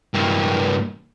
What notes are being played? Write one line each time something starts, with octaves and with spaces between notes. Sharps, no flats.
G2 A#3